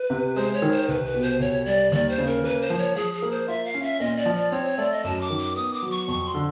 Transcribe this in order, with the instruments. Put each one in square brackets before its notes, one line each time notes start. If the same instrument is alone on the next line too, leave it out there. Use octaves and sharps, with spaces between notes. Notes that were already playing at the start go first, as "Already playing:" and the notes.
Already playing: [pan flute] B4
[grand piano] C3
[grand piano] G#3 [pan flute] C5
[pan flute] C#5
[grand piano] D#3
[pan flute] C5
[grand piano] C2 [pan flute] B4
[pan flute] B4
[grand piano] B2
[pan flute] C5
[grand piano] C2 [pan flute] C#5
[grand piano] G3 [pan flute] D5
[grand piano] D#2 [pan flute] D5
[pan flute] C5
[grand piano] C#3
[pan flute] A#4
[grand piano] A#3 [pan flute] B4
[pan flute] C5
[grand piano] F3
[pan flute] C#5
[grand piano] F3 [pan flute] G#4
[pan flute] G#4
[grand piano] A#3
[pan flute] C5
[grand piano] F4 [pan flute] E5
[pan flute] F5
[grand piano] C#4
[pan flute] E5
[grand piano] A#2 [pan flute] D#5
[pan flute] D5
[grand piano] F3
[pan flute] D5
[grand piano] C4 [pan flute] C#5
[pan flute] C#5
[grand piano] A3 [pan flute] D5
[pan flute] D#5
[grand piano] F#2 [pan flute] A5
[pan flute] D6
[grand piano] D#3
[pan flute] D6
[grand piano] B3 [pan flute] D#6
[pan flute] D6
[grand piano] F#3
[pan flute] C#6
[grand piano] F2 [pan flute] C#6
[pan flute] C6
[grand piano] D3